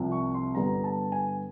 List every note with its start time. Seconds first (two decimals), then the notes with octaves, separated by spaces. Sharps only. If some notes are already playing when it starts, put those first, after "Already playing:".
Already playing: C2 C3 F3
0.12 C#6
0.34 C6
0.55 G2 D3 G3 B3 A#5
0.84 A5
1.12 G#5